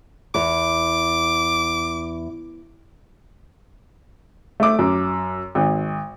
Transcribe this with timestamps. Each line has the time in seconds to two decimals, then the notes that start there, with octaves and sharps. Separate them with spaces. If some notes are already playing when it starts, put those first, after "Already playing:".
0.35 E2 D6
4.60 A3 E5 D6
4.79 F#2
5.55 G#1